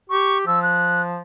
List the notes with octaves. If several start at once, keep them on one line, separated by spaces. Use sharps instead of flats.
G4 C#6
F3 E6
F#6